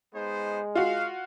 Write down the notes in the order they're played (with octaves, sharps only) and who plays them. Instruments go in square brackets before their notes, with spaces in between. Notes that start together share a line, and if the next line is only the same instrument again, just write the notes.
[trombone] G#3 [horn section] B3 D#4 C5
[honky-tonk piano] F4 F#4 [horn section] F5